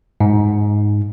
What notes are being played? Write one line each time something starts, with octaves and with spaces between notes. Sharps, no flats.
G#2